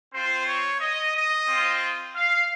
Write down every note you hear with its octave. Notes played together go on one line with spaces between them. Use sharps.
C4 F4 C5
C#5
D#5
D#5
C4 F4
F5